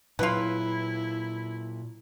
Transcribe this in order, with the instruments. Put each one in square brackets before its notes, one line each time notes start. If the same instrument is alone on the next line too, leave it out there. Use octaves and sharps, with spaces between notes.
[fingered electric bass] A#2 F#3 [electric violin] E4 [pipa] F4 B4